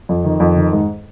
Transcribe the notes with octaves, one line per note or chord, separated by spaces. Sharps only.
F2
D#3
F2
D#3
G#2